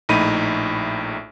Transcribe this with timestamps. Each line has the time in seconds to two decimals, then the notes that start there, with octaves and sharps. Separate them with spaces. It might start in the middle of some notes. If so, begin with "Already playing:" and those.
0.09 A#1 A2 D#4 B5 D#7